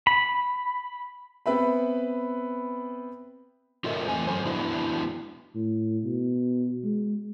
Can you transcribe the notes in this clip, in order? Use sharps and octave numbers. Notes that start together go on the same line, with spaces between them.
B5
B3 C4 B4 E5 B5
F4 F#4 A4 A#4 D#5 E5
E2 A3 C4 G#5
F#3 A4 C5
B3 D4 E4 F#4
A2
B2
G#3